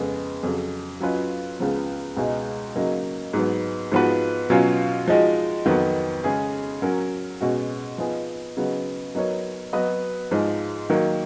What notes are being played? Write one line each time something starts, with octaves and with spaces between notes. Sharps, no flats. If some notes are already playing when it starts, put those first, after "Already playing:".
Already playing: F2 C#3 G#3 B3
F2 C#3 F#3
F#3 C#4 F4 B4 D#5
C#2 C#3 F3 B3
C#2 B2 G#3 D#4
C#3 F#3 A#3 D#4
G#2 F#3 B3
G#2 F3 B3 F#4 B4
B2 F#3 C#4 F4
F3 G#3 D#4 F#4
F2 D#3 F#3 B3
C#3 G#3 C#4 G#4
F#3 C#4 F#4 A#4
B2 G#3 C#4 F#4
F3 B3 D#4 G#4
C#3 F#3 B3 D#4
F#3 B3 D#4 A#4 C#5
F#3 B3 F#4 B4 D#5
G#2 F3 G#3 D#4
D#3 F#3 A#3